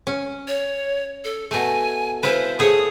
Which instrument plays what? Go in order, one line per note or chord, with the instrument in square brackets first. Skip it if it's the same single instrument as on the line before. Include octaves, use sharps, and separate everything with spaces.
[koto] C#4
[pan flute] C#5
A4
[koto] B2 A3 [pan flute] G#5
[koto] E4 F4 B4 [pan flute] C5
[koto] A3 G#4 C#5 [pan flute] D#6